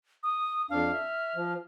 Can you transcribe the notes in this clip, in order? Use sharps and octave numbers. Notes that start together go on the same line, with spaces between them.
D#6
F2 D4 F5 F6
E5
F3